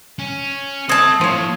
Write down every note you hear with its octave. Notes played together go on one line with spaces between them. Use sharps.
C#4
C4 A4 E5 A5 D#6 G#6
A2 F3 C#5